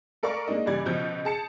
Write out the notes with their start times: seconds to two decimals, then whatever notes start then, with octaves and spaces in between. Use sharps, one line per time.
0.23 A4 A#4 D5 F5 C#6
0.48 G#3 A#3 D4 D#4 D#5
0.66 C#2 G2 E3 G3 D5 G#6
0.86 C#2 B2 F3 G6
1.25 G#4 A5 C#7